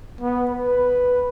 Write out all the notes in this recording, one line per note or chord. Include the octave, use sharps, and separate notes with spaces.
B3
B4